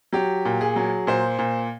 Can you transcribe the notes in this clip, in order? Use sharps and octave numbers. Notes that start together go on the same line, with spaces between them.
F#3 G4
A#2
G#4
F#3
A#2 C5
A#2